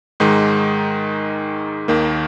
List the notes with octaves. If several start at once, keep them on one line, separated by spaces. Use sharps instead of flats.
G#2 D#3 G#3 D#4
D#2 D#3 A#3